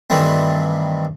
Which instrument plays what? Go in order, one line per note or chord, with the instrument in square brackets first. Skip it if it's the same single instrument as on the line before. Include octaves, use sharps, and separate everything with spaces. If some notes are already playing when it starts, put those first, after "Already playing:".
[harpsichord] G2 D#3 E3 G3 A3 C4